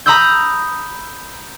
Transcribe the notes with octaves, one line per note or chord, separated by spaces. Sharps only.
A#5 B5 D#6 E6 G6